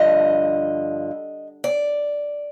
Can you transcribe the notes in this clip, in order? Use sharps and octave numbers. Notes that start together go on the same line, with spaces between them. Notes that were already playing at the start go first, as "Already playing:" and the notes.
Already playing: G2 D3 F3 D#5
D5